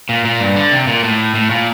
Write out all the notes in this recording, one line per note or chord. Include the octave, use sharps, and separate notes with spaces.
A#2
A#2
G2
D3
C3
A#2
A2
A2
A#2